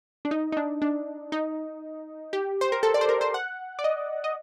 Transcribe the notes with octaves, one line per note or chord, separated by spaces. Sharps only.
D4
D#4
D#4
D4
D4
D#4
G4
C5
A#4
A4
D5
C5
A#4
C5
F#5
D5
D#5
D#5